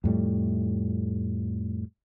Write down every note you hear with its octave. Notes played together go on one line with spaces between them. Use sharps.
F2 A2 G3 A3